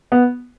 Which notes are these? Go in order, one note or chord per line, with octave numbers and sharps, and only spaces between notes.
B3